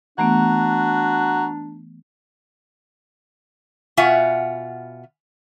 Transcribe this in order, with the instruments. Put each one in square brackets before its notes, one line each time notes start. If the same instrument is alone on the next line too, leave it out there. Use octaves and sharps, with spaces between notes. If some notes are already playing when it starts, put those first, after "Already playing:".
[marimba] E3 A3 B3 [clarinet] D4 [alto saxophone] F#4 [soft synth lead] A#5
[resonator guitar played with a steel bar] B2 F4 E5 F#5 G#5